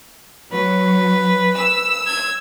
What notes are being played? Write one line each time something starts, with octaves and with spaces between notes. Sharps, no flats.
F#3 B4
E6
G#6